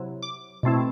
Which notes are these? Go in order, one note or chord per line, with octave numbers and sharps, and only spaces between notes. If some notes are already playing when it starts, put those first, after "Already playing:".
Already playing: C3 F#3 E4
D6
B2 A3 C4 E4